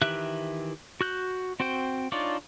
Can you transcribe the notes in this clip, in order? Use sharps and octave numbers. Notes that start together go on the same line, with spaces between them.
D#3 E3 G4 E5 F#6
F#4 F#6 G6
C4 F#4 C5 G5
D4 D#4 F4 C#5 D5